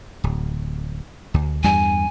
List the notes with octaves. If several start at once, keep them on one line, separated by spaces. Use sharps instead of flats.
D1
D2
E2 G2 G3 G#5